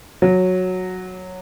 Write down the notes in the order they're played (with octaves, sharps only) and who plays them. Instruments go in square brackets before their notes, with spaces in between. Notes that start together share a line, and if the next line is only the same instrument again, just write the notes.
[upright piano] F#3